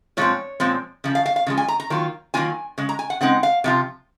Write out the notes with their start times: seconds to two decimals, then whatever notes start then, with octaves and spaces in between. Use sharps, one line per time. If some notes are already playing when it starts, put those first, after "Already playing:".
0.17 A#2 F3 G#3 C4 C#5
0.60 A#2 F3 G#3 C4
1.04 C#3 F3
1.15 F5
1.26 F5
1.36 F5
1.47 C#3 F3 G#3
1.57 G#5
1.68 A#5
1.80 A#5
1.90 D#3 F#3 A#3 F4
2.34 D#3 F#3 A#3 F4 G#5
2.78 C#3 G#3
2.89 A#5
2.99 G#5
3.10 F#5
3.21 C#3 G#3 C4 D#4 F#5
3.43 F5
3.64 C3 F3 F4